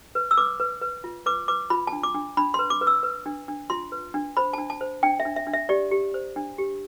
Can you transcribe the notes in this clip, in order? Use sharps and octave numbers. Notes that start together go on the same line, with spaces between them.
B4
E6
B4 D6
B4
B4
F4
B4 D6
B4 D6
F4 B5
D4 A5
D6
D4
D4 B5
B4 C6
D6
B4
E6
B4
D4
D4
F4 C6
B4
D4
C5 B5
D4 A5
A5
C5
D4 G5
E5
D4
E5
D4
E5
G4 D5
G4
C5
D4
G4